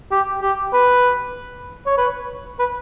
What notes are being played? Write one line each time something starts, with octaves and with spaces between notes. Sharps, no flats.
G4
G4
B4
C#5
B4
B4